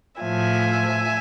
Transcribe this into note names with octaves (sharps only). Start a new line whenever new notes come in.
A2 F3 E5 G#5